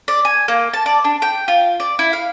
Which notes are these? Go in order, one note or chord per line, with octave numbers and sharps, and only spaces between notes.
D5
G#5
A#3
A5
D5
D4
G5
F4
D5
E4
F5